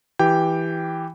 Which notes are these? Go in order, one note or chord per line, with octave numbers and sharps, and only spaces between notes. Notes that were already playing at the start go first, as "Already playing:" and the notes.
E3 G4 G5